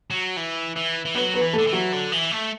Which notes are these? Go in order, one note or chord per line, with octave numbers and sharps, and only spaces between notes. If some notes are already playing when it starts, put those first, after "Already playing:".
F#3
E3
E3
E3
F#3 B3 B4
B3 B4
E3
A3 A4
D3
E3
F#3 F#4
D3
E3
A3